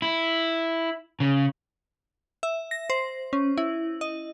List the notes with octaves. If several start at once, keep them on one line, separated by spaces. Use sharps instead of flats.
E4
C#3
E5
A#6
C5
C#4
E4
D#5